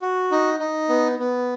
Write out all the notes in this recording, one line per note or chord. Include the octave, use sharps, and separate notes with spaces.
F#4
D#4
D#4
B3
B3